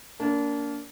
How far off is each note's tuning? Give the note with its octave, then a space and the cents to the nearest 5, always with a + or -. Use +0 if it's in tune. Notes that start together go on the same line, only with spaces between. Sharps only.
A#3 +0 D4 -30